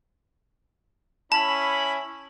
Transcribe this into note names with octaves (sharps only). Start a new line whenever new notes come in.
C#4 E4 A5 B5